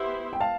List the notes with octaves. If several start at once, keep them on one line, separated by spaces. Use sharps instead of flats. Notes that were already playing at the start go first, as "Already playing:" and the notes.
Already playing: B3 E4 G4 C5 E5
G5
F5 A5